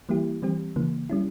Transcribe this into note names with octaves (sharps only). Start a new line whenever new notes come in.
E3 G3 A#3 E4 G4
E3 G3 C4 G4
C#3 E3 A#3
G3 C#4 E4